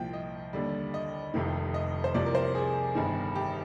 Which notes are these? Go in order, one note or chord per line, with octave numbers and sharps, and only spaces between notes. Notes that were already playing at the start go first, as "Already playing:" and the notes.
Already playing: C2 A#2 F3 G5
D#5
D#2 D3 G3
D#5
F1 F2 C3 D#3
D#5
C5
C2 C3 F3 D5
A#4
C5
G#4
G1 G2 D#3
G4